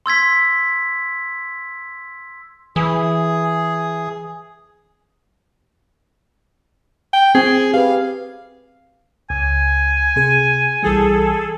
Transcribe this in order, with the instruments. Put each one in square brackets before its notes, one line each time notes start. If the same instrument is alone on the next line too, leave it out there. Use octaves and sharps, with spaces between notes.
[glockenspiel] C6 E6 G#6 B6
[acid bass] E3 [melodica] G#4
[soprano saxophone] G5
[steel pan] C4 [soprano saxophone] G#4
[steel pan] G4 B4 [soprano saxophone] F5
[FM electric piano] C#2 [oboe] G#5
[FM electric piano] C3 G#4
[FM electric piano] B1 E3 G3 [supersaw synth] G#4 A4